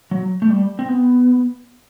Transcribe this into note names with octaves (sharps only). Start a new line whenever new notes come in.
F#3
A3
G3
C4
B3